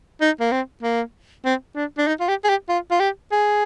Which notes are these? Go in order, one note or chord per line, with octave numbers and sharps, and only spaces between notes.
D#4
A#3
C4
A#3
C4
D4
D4
D#4
F4
G4
G#4
G4
F4
F4
G4
G#4